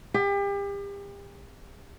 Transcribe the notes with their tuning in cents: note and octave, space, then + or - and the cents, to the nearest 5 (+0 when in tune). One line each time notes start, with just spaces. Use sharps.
G4 +35